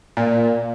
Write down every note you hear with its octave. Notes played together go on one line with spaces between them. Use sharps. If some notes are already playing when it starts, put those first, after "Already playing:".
A#2